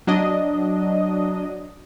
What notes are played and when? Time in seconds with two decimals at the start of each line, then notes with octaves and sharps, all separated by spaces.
0.07 F#3 D4 D#5